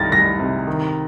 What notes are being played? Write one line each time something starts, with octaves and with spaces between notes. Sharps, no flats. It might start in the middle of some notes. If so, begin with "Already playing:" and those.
Already playing: C2 D#3 A6 A#6
C2 A#6
C3
D#3